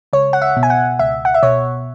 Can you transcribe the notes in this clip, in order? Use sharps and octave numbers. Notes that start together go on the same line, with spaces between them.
C#2 C#5
F#5
E5
B2
G#5
F#5
C#2 E5
F#5
E5
B2 C#5